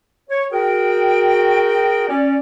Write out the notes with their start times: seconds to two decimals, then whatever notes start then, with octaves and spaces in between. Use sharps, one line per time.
0.30 C#5
0.53 F#4 G#4 A#4 G5
2.09 C#4 D5